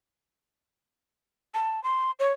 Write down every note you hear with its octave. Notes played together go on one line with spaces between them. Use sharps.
A5
C6
C#5